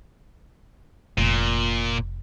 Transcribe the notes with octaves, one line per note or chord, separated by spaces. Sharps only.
F1 A#2